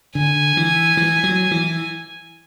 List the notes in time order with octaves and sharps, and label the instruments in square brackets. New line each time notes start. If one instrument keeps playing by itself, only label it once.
[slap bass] D3 [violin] G#5
[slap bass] E3
E3
F#3
E3